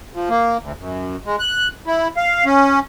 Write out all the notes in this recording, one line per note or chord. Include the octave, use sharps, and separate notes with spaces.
F3
A#3
D2
F#2
G#3
F#6
E4
F5
C#4